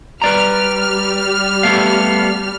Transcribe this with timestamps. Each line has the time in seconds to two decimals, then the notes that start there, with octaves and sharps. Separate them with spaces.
0.22 G3 B4 D5 A#5 F6
1.63 A3 B3 F5